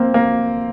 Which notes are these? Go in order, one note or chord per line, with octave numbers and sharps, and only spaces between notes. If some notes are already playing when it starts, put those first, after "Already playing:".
Already playing: A#3 C4
A#3